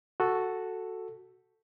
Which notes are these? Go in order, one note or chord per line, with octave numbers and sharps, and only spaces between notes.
F#4 A4